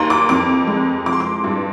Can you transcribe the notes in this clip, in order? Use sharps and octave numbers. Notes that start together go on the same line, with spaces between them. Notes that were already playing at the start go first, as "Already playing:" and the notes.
Already playing: D#2 D#3 A#5 C6
D6
F2 D6
G#3
F3 D6
C6
D6
G2